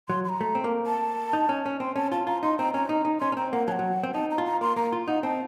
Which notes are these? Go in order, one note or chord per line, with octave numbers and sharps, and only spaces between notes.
F#3 C6
C6
A#5
A3
C4
A#3
A5
D#4
C#4
C#4
C4 C6
C#4 A5
F4 A5
F4 A#5
D#4 C6
C4 A#5
C#4 A#5
D#4
D#4
C#4 C6
C#4
C4 A#5
A#3 F#5
F#3 A5
F#5
F#3
C4
D#4 A5
A#5
F4
A#5
A#3 C6
A#3 A#5
F4
D#4 F#5
C4 A5